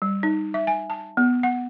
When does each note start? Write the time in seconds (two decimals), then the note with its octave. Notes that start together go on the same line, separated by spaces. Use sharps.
0.02 G3
0.23 D#4
0.54 E5
0.67 G#5
0.90 A5
1.17 B3
1.43 F#5